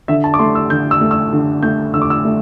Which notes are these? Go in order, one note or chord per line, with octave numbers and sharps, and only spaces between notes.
D3 E5
A5
D6
A3 C6
E6
D3 G6
E6
A3
E6
D3
A3 G6
D3 E6
D6
E6
A3